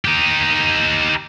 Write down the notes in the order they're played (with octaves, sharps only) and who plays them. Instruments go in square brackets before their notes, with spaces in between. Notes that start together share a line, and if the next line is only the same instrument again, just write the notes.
[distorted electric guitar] D#4 G4